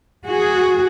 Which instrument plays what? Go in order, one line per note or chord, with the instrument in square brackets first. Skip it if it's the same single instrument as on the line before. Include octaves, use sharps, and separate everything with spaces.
[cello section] F#4 G#4